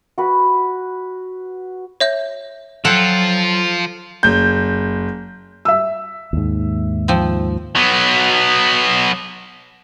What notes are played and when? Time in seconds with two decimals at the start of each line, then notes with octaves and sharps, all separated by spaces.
0.18 F#4 B4
2.00 C#5 E5 G6
2.85 F3 F#3 F4 A4 F#5 G5
4.23 F#1 G6
5.65 E5 E6
6.33 D#2 G#2
7.08 F3 C4
7.75 F#3 B3